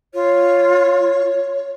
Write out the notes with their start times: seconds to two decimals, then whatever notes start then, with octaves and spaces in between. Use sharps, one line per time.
0.14 F4 C#5